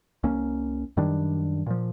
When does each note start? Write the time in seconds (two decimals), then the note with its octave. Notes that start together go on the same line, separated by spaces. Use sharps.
0.23 C2 A#3 C#4
0.97 F#2 D#3 G3 D4
1.66 A#2 F3